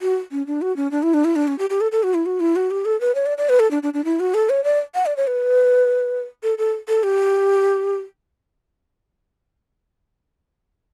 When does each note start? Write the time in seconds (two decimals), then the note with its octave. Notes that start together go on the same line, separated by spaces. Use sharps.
0.02 F#4
0.32 C#4
0.47 D4
0.62 F#4
0.77 C#4
0.91 D4
1.03 E4
1.14 D4
1.25 E4
1.36 D4
1.48 C#4
1.59 G4
1.70 G4
1.81 A4
1.92 A4
2.03 F#4
2.14 E4
2.26 F#4
2.40 E4
2.56 F#4
2.71 G4
2.85 A4
3.01 B4
3.15 C#5
3.26 D5
3.38 D5
3.49 B4
3.60 A4
3.71 D4
3.83 D4
3.94 D4
4.05 E4
4.20 F#4
4.34 A4
4.50 C#5
4.64 D5
4.95 F#5
5.06 D5
5.17 C#5
5.27 B4
6.43 A4
6.58 A4
6.89 A4
7.03 G4